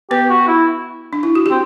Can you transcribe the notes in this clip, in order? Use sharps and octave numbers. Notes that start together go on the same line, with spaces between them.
B3 G4 B4
F#4
E4
D4
E4
F#4
C4 G4